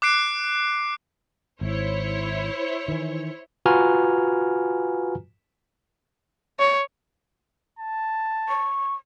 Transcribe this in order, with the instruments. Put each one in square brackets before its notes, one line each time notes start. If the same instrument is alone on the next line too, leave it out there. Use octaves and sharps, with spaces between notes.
[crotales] D6 F#6 C7 D7
[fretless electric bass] G#1 [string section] E4 C5 C#5
[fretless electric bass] D#3 E3
[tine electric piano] F4 F#4 B4 G#5 A#5 F6
[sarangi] C#5
[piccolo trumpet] A5
[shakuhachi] C#6